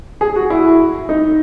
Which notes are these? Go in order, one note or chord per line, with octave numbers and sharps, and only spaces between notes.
G#4
F#4
E4
D#4